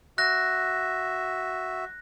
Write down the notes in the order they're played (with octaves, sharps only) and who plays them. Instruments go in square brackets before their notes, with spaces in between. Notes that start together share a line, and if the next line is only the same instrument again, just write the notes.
[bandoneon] F#4 E5 [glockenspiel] F#6 A#6